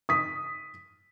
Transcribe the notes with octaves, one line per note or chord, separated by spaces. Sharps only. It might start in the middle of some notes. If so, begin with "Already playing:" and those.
D#6 B6